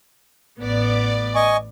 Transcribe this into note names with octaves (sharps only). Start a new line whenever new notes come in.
A1 B3 D5
D#5 G#5 C#6